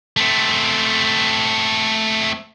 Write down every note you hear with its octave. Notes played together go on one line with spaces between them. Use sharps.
A3 C4